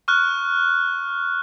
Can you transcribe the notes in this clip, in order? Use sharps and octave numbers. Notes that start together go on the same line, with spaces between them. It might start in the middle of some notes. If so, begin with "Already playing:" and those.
C#6 F6 F#6